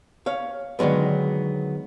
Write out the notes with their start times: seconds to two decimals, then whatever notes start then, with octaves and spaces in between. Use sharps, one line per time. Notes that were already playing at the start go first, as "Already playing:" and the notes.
0.26 C#5 F5
0.79 D3 D#3 F#3 G#3 B3